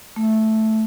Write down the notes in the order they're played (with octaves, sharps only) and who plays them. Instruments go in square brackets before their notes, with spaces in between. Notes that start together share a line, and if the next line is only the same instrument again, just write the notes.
[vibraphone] A3